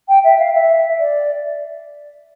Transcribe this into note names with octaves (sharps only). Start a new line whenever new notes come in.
G5
E5
F5
E5
D5